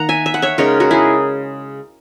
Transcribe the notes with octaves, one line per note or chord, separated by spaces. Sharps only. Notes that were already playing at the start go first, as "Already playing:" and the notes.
Already playing: D#3 A#3 F#5 A#5
E5 G#5
E5
F#5
C#5 E5
C#3 G#3 D#4 A#4 C#5
F#4 A#4
E4 G#4